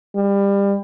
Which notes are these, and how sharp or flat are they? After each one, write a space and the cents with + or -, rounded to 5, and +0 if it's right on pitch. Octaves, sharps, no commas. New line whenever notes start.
G3 +25